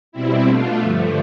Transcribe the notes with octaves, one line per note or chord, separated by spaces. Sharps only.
B2 G3 C4 E4
B2 A3 D4 F4
G2 D3 F3 A3